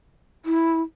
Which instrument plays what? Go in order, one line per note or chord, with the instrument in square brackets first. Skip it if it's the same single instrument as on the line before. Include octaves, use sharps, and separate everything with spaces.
[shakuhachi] E4